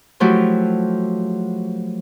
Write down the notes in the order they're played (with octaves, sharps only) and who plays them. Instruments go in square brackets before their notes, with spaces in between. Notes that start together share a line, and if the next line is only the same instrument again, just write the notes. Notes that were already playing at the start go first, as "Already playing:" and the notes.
[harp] F3 F#3 A3 E4 F#4 G4